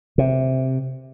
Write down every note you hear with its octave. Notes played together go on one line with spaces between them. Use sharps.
C3